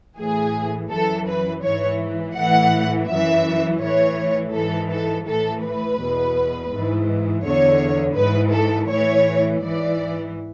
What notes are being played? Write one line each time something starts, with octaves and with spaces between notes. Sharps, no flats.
A2 E3 G#4
F#2 E3 A4
B4
G#2 E3 C#5
A2 E3 F#5
F#2 E3 E5
A2 E3 C#5
G#2 E3 A4
A4
A2 E3 A4
B4
E2 B2
G#2 E3
E2 D3 C#5
G#2 E3 B4
A4
A2 E3 C#5
G#2 E3 D5